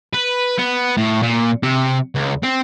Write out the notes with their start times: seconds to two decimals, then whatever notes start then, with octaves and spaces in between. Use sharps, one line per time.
0.13 B4
0.58 B3
0.97 A2
1.22 A#2
1.63 C3
2.15 C#2
2.43 C4